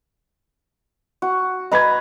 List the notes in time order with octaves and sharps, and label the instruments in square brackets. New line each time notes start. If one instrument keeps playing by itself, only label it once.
[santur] F#4
[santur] B4 A#5 [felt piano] D#5 B5 G#6